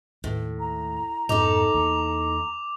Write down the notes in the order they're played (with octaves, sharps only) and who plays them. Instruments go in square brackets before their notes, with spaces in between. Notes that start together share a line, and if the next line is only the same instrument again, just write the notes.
[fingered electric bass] D#2 [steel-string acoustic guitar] A2
[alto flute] A#5
[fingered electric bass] F2 G#2 B2 [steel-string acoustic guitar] D#4 A4 [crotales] D6 F7
[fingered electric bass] E2 E3 A#3